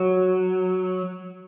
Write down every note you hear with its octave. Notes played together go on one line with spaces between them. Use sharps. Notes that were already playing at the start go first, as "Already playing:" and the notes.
Already playing: F#3